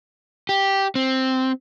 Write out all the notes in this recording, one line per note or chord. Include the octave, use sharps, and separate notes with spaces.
G4
C4